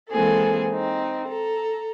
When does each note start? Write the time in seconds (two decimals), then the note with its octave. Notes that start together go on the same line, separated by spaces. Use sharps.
0.10 E3 G#3 A#3 C4 G#4 A4
0.72 C4 D#4
1.29 A4 A#5